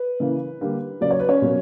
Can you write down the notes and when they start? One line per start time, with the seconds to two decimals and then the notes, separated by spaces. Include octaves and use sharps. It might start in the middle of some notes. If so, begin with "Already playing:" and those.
Already playing: B4
0.20 C#3 E3 A#3
0.61 D3 G3 A#3
1.01 C#3 F#3 A#3 D5
1.11 C#5
1.19 B4
1.29 C#4 C#5
1.42 B2 F#3 A#3